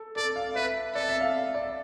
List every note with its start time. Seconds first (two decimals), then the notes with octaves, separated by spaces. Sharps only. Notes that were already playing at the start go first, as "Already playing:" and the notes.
Already playing: A4
0.16 A4 D5
0.36 F5
0.56 B4 E5
0.95 A4 D5
1.09 E5
1.21 F5
1.55 D5